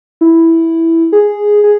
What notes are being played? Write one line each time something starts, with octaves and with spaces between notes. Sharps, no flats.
E4
G#4
G#4